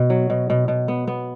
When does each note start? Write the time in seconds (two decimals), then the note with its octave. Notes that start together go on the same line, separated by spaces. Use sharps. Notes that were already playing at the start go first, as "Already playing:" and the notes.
Already playing: B2
0.10 F#3
0.30 B2
0.50 B2
0.68 B2
0.88 B3
1.07 B3